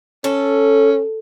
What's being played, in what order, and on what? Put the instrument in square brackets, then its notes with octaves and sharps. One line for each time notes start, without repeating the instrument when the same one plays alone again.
[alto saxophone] C#4 [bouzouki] A4